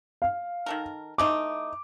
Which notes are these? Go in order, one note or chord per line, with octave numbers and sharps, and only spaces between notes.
F5
D#3 A4 A#4
E3 A3 D#4 D6